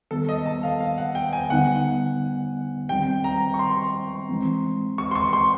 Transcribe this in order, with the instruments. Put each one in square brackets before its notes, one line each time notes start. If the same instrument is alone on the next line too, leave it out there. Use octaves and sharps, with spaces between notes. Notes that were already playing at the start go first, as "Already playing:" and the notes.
[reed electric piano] D#3 G3 B3 [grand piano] A4
[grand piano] D#5
A5
F5
F5
F#5
G5
G#5
[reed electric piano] D3 G3 B3 D#4 [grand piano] F#5
[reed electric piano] D#3 G3 C4 [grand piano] G5
[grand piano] A#5
C#6
C6
[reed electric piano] E3 G#3 C4
[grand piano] C#6
C6
C#6
C6